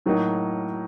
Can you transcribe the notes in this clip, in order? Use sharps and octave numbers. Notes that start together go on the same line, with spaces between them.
A2 F#3 A#3 D#4